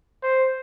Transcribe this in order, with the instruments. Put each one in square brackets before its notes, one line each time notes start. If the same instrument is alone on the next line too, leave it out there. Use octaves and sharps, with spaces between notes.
[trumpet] C5